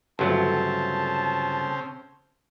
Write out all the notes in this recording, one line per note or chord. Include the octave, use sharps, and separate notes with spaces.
G1 C#3 F#3 A3 C4 A5